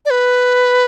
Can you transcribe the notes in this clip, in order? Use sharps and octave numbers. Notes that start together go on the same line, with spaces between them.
D5
B4